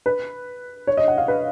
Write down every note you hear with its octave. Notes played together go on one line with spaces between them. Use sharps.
B4
C#5
D#5
F#5
F5
B4